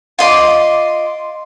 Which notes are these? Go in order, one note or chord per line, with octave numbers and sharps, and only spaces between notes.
F4 D#5 C6 D6